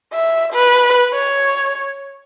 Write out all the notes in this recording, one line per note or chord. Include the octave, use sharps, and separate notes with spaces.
E5
B4
C#5